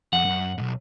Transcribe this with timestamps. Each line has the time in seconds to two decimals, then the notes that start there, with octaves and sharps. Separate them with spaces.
0.13 F2 F#5
0.25 F#2
0.58 B1 G#2